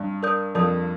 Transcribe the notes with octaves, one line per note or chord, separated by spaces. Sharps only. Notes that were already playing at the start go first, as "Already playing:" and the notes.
Already playing: G2
A#4 D5 A5 D#6 G6
F2 A#4 D5 A5 D#6 G6